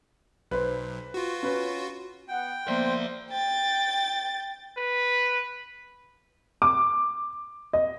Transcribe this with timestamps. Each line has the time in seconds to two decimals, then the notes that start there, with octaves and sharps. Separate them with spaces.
0.51 B1 B4 C5
1.14 F4 F#4
1.43 C#4 B4
2.28 B3 F#5 G5
2.68 F3 A#3 B3 C5 D5 E5
3.30 G5 A6
4.77 B4
6.62 D6
7.73 D#5